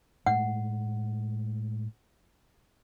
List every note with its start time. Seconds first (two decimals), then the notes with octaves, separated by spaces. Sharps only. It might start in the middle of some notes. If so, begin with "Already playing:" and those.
0.26 A2 G#3 A3 F#5